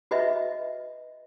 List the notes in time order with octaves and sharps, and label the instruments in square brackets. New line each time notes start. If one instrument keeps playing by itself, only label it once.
[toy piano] F#4 B4 D#5 E5